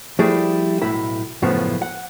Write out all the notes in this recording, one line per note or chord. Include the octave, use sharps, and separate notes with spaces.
F3 G3 A3 E4 G#4 D5
B1 A2 E4 B5
F#2 A2 C#3 F3 B3
F#5